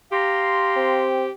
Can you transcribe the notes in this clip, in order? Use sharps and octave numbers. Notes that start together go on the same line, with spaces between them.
G4 F5 A#5 C6
C4